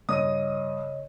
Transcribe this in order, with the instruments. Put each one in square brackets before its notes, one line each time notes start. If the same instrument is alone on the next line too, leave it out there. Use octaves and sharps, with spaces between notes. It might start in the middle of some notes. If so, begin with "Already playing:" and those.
[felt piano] G2 D#7 [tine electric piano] C#3 C#5 D#5 [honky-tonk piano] D#6